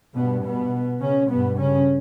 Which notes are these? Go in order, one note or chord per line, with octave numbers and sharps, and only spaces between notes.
G2 B2 B3
B2 B3
C#3 C#4
G2 B2 B3
C#3 C#4